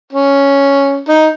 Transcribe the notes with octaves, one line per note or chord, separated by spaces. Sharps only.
C#4
D#4